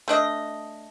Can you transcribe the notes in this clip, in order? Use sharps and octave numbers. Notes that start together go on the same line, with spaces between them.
A3 D4 D#5